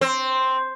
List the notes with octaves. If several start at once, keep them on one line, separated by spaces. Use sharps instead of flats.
C4